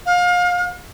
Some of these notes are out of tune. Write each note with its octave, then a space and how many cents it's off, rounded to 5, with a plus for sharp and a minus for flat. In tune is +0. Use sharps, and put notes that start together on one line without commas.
F5 +30